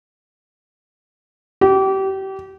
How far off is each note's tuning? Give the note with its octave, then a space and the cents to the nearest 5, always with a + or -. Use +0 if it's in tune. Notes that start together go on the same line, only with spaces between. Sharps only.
G4 -30